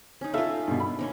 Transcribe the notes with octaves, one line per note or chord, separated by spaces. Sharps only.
C#4 D#4
D#4 F4 A4 E5 F5
G2 B2
B5
A#3 C#4 D#4